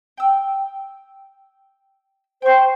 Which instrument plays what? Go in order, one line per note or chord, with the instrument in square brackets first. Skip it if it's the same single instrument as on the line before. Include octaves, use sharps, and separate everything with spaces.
[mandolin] G5 E6
[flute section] C5 [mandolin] G5 C#6